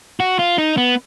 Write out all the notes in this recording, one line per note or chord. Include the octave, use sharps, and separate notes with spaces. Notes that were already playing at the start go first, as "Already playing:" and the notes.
F#4
F4
D#4
B3